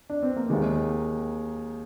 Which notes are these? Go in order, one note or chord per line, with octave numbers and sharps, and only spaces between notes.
D4
C4
A#3
D#2 D#3 G#3